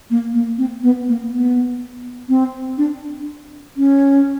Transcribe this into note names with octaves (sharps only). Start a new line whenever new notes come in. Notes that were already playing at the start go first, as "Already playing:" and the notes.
A#3
A#3
C4
B3
A#3
B3
C4
D4
C#4